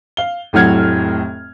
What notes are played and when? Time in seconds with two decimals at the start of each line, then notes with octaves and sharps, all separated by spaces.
0.17 F5 G7
0.53 F1 A2 F#3 F#5 F6 G#6